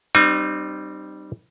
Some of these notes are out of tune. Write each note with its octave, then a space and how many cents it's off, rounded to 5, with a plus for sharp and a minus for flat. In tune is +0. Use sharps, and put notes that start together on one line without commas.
G3 -5 C4 +0 D#4 -35